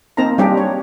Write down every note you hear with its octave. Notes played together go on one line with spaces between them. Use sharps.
A#3 C4 D#4 A#4 A5 A#5
G3 C4 D4 G4 G#4
C#5